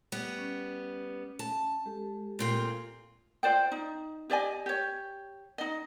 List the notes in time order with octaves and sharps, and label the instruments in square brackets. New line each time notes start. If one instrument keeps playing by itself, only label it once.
[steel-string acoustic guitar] G3 B3
[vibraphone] C#4
[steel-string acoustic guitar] A5
[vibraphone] G#3 G4 A4
[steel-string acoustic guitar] A#2 C4 F4
[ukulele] F4 C5 D5 G5
D#4
G4 D5 D#5 G#5
G4 C#5
D#4 D#5